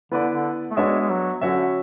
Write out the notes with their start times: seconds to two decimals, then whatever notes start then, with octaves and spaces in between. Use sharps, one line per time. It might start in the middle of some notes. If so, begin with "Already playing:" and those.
0.12 D3 B3 E4 B4 D5
0.33 D3
0.71 A3
0.77 G#3 B3 D4 F#4 C#5 E5
1.00 G#3
1.10 F#3
1.41 D3 F#3 C#4 F#4 C#5 E5